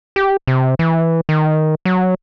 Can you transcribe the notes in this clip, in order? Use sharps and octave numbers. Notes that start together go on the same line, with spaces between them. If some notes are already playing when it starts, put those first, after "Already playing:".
G4
C3
E3
D#3
F#3